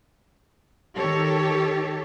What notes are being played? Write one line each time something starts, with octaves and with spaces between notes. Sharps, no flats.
D#3 G4 A4 C#5